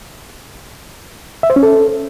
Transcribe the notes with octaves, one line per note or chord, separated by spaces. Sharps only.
E5
C5
C#4
A4